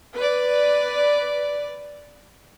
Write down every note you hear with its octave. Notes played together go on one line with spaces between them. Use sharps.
B4 D5